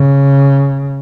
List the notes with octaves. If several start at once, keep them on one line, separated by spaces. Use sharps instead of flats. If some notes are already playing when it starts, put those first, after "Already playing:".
Already playing: C#3